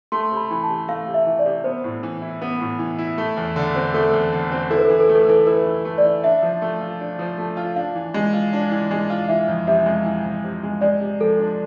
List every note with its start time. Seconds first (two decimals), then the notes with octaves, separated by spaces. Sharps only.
0.12 A3 C6
0.31 C3
0.37 B5
0.51 E3
0.63 A5
0.69 C3
0.88 A3 F5
1.07 C3
1.14 E5
1.26 E3
1.39 D5
1.46 C3
1.64 B3 C5
1.84 A2
2.03 E3
2.22 E4
2.41 B3
2.60 A2
2.79 E3
2.99 E4
3.18 A3
3.37 E2
3.56 D3
3.75 C4
3.94 A3 A4
4.13 E2
4.32 D3
4.51 C4
4.70 E4 A4
4.78 B4
4.85 A4
4.90 E3 B4
5.00 A4
5.08 A3 B4
5.15 A4
5.22 B4
5.28 E3 A4
5.47 E4 B4
5.66 E3
5.85 A3
5.98 D5
6.04 E3
6.24 D4 E5
6.43 F3
6.62 A3
6.81 F4
7.00 D4
7.19 F3
7.38 A3
7.57 F4
7.76 D4 F5
7.95 E3
8.14 G#3
8.33 F4
8.53 D4
8.71 E3
8.91 G#3
9.10 F4
9.28 E3 E5
9.48 F2
9.67 C3 E5
9.86 G#3
10.05 E3
10.25 F2
10.44 C3
10.63 G#3
10.81 G#3 D5
11.01 C3
11.20 F3 A4
11.39 D4